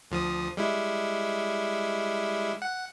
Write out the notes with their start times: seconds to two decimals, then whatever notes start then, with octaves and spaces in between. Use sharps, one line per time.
0.11 D2 F3 D#6
0.57 G3 G#3 E4
2.62 F#5